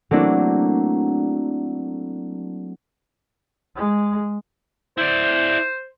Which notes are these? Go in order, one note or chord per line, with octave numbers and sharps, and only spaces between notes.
F#3 A3 A#3 C4 D4 E4
G#3
E4 C5 D5